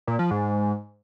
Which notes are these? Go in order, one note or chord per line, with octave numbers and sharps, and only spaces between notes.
A#2
F3
G#2